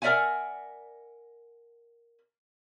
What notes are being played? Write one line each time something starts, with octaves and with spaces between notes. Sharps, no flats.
A#4 D5 E5 F#5 G#5